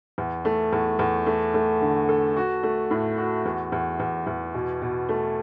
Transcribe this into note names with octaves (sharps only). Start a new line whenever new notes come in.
E2
A3
E2
E2
A3
A3
D3
A4
F#4
A3
A2
F#4
E2
E2
E2
E2
B2
B2
A3